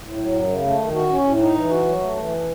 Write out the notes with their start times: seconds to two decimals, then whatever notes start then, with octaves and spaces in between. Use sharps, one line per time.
0.01 A2
0.16 F#3
0.32 F#2
0.47 C#3
0.63 A3
0.78 D#3
0.93 F#4
1.09 C#4
1.24 A2
1.40 D#4
1.55 E3
1.70 F#4
1.86 F#3
2.02 A3
2.16 E3